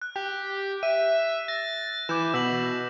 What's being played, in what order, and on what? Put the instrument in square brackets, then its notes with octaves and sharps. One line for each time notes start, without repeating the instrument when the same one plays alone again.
[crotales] F#6
[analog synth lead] G4
[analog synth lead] E5 [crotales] D#7
[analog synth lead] A6 [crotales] A#6
[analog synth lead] E3 [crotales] D6 G6 E7
[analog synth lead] B2 [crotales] E6 B6 F#7